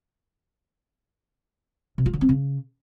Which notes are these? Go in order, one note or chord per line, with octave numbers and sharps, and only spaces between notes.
C3
F4
D3
C4
C#3